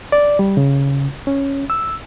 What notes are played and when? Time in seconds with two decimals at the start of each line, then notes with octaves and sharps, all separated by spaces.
0.12 D5
0.39 G3
0.57 C#3
1.27 C#4
1.70 E6